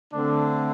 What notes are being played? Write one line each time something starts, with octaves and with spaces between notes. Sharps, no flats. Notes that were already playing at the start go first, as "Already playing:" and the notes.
D3 A3 C4 D4